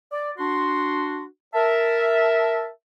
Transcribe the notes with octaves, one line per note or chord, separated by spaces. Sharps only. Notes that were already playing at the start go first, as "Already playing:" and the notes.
D5
D4 F#4 C6
A#4 E5 A5